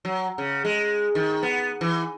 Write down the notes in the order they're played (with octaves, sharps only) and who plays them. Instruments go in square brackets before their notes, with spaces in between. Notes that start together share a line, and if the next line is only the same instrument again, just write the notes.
[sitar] F#3
C#3
G#3
D#3
B3
E3